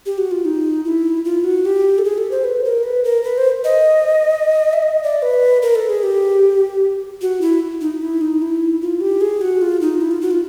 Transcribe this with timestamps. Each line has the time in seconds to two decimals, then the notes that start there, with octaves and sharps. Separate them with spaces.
0.06 G4
0.18 F#4
0.31 F4
0.45 D#4
0.85 E4
1.25 F4
1.44 F#4
1.65 G4
1.98 A4
2.05 G#4
2.18 A4
2.31 C5
2.44 B4
2.64 A#4
2.83 B4
3.04 A#4
3.24 B4
3.38 C5
3.64 D#5
4.73 E5
4.83 D#5
5.03 D5
5.22 B4
5.62 A#4
5.75 A4
5.89 G#4
6.03 G4
7.21 F#4
7.41 E4
7.81 D#4
8.02 E4
8.21 D#4
8.42 E4
8.82 F4
9.01 G4
9.21 G#4
9.41 F#4
9.61 F4
9.81 D#4
10.01 E4
10.11 F4
10.21 F#4
10.31 F4